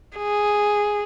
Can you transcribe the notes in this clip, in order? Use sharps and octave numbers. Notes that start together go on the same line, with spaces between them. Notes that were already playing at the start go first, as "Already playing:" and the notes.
G#4